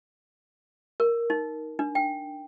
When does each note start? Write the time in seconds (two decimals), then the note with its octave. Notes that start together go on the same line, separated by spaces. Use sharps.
1.00 A#4
1.30 D#4
1.79 D4
1.95 G5